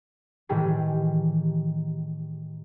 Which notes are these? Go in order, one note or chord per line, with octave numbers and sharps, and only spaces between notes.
A2 D#3 E3 G3 G4 G#4